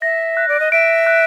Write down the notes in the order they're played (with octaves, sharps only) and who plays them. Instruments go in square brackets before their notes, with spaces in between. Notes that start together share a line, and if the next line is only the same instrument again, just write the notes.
[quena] E5 [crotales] A#6
[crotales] F#6
[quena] D5
D#5
[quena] E5 [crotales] D7
[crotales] F#6